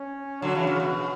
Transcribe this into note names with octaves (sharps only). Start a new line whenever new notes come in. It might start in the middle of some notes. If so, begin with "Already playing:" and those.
Already playing: C#4
D3 F#3 F#4
C#3 E3
C#3
B2